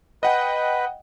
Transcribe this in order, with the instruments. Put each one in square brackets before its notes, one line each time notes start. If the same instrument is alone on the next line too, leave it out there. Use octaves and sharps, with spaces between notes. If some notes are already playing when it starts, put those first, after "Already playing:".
[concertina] B4 [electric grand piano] D#5 F#5 G5